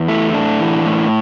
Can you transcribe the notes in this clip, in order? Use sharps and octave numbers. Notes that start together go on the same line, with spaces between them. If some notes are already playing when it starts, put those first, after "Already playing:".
Already playing: E2
A3 E4
A2 D4
E3
A2